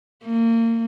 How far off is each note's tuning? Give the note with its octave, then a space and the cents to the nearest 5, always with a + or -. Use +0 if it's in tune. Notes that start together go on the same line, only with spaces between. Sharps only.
A#3 -30